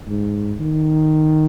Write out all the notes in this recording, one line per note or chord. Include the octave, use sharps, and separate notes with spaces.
G#2
D#3